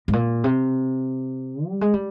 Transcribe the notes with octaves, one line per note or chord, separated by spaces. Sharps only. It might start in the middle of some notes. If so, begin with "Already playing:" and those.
G#2
A#2
C3
G3
G#3
G3